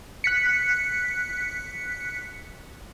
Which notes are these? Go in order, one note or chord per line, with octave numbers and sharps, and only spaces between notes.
F#6 B6 C#7